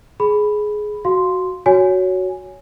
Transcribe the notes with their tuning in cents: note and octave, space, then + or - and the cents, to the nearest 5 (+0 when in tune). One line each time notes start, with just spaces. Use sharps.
G#4 +15 B5 +0
F#4 +0 F5 +0 C6 +0
F#4 +0 C#5 +15 G#5 +0